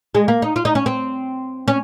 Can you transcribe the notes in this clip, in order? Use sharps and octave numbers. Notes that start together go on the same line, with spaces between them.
G#3
A#3
D#4
F4
D#4
C#4
C4
C#4